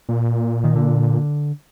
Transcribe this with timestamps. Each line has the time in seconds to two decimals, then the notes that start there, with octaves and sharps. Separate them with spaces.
0.09 A#2
0.64 D#3
0.76 D3